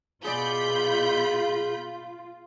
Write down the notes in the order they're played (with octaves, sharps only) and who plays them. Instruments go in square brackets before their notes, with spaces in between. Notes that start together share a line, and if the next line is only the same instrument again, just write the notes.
[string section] B2 B5 G6 [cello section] F4 [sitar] G#4 D5